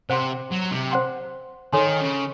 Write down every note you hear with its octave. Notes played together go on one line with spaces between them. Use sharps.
C3 C5 F#5 C6
F#3
C3
C5 F#5 C6
D#3 A4 C#5 G#5 C6
C#3